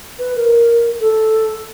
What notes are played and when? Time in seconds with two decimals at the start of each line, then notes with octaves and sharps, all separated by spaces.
0.19 B4
0.35 A#4
1.00 A4